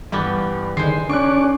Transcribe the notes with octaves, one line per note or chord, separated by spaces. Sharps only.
G2 E3 G3 B3
D3 D#3 G#3 C5 C7
C#4 D4 D5 C#6 F#6